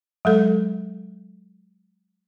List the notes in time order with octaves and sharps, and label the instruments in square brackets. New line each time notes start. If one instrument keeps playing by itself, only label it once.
[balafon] F#3 G#3 A4